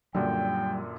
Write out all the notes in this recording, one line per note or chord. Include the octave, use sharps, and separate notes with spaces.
F#2 A#2 D3 F#3 G3 G5